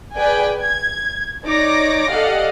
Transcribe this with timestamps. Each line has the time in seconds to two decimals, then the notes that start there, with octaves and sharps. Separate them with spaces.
0.14 G#4 B4 D5 G5 G#5
0.60 G#6
1.45 D#4 C#5 D5 D6 A#6
2.10 G4 A4 D5 D#5 F5 F#5